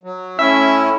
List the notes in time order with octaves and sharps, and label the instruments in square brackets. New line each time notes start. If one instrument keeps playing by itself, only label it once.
[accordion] F#3
[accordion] A2 C#4 E4 [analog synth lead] E5